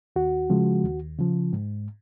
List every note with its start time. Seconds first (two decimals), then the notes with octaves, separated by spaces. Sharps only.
0.16 D#2 F#4
0.50 C#3 F3 G#3
0.84 D#2
1.19 C#3 F3
1.53 G#2